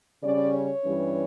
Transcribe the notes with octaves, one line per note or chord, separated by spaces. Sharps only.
C#3 G3 C#4 D5
C#5
G2 E3 G3 C#4